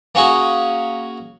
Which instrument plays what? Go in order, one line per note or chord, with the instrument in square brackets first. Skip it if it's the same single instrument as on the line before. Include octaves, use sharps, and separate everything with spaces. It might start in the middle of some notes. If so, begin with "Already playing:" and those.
[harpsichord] A#3 C#4 F#4 G#4